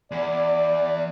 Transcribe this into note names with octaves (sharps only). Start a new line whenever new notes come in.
E2 D5